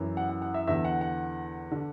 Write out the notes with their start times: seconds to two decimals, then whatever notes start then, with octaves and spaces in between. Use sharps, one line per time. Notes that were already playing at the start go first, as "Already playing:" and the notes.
Already playing: F#2 E3
0.17 F#5
0.29 F#5
0.42 F#5
0.54 E5
0.67 E2 D3 E5
0.85 F#5
1.01 F#5
1.71 D3